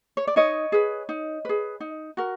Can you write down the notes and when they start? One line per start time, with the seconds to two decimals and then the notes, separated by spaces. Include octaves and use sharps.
0.17 C#5
0.27 D5
0.36 D#4 C#5 D#5
0.72 G#4 B4
1.09 D#4
1.45 G#4 B4
1.80 D#4
2.17 F#4 A#4